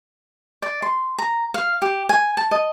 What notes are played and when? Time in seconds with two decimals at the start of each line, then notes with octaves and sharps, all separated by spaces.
0.62 D5
0.82 C6
1.18 A#5
1.54 F5
1.82 G4
2.09 G#5
2.37 A5
2.51 D#5